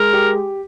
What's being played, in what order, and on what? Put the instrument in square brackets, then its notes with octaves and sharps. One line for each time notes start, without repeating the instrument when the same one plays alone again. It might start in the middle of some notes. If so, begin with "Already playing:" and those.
Already playing: [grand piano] G#3 [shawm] A#4
[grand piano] G4